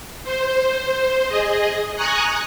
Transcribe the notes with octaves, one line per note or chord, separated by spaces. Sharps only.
C5
G#4 D#5
G#5 A#5 C#6 D#6 F#6